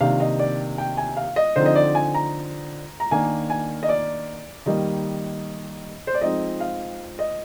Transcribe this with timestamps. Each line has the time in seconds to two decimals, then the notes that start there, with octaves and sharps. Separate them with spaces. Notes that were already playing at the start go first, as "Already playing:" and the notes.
0.01 C3 D#3 A#3 D4 F5
0.20 D#5
0.39 D5
0.78 G5
0.97 G#5
1.17 F5
1.36 D#5
1.56 D3 F3 C4 D#4 C5
1.66 D#5
1.76 D5
1.95 G#5
2.14 A#5
3.00 A#5
3.11 D#3 A#3 D4 G#5
3.50 G#5
3.83 D#5
3.89 D5
4.66 D#3 G3 A#3 D#5
6.07 C5
6.15 D5
6.21 F3 G#3 C4 D#4 D#5
6.60 F5
7.19 D#5